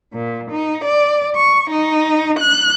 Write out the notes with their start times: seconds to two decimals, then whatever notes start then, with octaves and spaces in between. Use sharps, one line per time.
0.13 A#2
0.50 D#4
0.83 D5
1.34 C#6
1.70 D#4
2.39 F#6